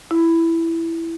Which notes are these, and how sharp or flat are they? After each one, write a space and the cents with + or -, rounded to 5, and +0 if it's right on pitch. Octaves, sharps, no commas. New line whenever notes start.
E4 +5